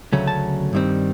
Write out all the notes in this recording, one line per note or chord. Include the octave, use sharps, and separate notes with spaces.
D2 C#3 F#3 A3 C#4
A5
G2 D#3 G3 C4